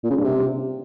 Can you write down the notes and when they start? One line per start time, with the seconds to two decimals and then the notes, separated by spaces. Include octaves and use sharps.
0.04 A#2
0.10 C#3
0.17 G2
0.24 C3